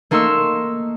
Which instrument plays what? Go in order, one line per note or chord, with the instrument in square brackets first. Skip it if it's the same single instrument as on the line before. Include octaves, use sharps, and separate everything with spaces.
[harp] A3 A#3 D#4 C6 C#6 E6